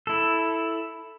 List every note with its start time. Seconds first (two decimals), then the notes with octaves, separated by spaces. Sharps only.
0.07 E4 A4